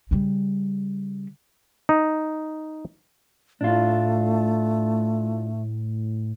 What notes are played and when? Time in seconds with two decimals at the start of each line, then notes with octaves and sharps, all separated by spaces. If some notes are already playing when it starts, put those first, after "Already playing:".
0.11 C#3 G3
1.89 D#4
3.61 A2 A3 D4 F4